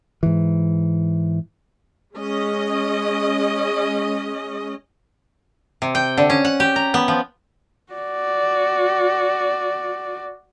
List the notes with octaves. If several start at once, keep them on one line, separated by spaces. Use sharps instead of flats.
G#2 E3
G#3 C#4 D#5
C3
G5
D3
C#4
F#5
G4
A#5
B3
F3
F#4 D5